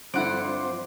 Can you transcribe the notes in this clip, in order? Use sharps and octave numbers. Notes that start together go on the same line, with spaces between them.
G2 D3 F3 C4 E4 C5 D5 F#5